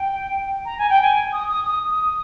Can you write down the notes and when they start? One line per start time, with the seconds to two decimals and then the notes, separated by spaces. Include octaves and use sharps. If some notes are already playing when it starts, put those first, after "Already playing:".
Already playing: G5
0.65 A#5
0.78 G#5
0.90 G5
1.02 G#5
1.32 D#6
1.49 D#6
1.66 D#6
1.91 D#6